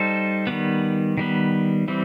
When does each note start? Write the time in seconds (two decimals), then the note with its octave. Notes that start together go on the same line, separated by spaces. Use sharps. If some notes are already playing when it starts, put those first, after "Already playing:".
Already playing: G3 D#4 A4 C5
0.47 D#3 G3 B3
1.17 D#3 G3 B3
1.88 E3 G3 C4